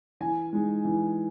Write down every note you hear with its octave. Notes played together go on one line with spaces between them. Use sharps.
E3 G#5
G#3 D#4
E3